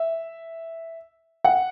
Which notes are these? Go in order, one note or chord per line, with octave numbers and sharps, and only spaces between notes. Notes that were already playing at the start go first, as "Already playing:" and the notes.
Already playing: E5
F#5